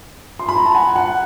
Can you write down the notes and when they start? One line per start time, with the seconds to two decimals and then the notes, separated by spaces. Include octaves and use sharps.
0.39 C6
0.49 B5
0.57 A#5
0.66 A5
0.75 F#5 G#5
0.96 F#5